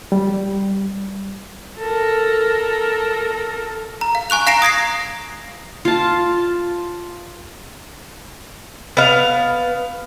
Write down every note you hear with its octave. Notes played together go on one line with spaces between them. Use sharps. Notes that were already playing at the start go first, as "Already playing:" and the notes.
G3
A4 A#4
A#5
F5
G#5 C#6 F#6 F7
F5 A#5 A#6 C7 D7 E7
D#6 G#6 A#6 C7
F4 A5
B3 F5